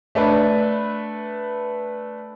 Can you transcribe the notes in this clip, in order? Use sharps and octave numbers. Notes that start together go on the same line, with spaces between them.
A3 D4 B4